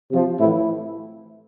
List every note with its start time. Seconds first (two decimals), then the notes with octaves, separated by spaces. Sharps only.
0.11 C3 F3
0.39 A2 E3 E4